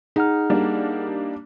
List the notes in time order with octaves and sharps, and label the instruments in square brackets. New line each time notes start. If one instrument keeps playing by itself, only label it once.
[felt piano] D#4 [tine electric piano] G#4 F#5 F6
[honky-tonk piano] G3 A#3 D4